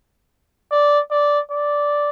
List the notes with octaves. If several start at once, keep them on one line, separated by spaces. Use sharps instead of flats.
D5
D5
D5